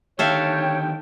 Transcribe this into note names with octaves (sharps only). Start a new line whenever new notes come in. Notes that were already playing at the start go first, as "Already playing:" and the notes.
D3 D#3 G4 A4 C#5 E5 F5 G5